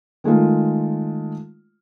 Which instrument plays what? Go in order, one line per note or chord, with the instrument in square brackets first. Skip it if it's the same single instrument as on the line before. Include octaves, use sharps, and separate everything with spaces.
[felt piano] D#3 G#3 A3 F4